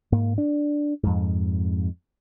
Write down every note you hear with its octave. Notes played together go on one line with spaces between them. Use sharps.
G#2 A#3
D4
F2 G#2